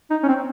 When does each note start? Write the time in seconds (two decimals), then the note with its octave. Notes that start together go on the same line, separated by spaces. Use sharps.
0.11 D#4
0.23 C#4
0.28 C4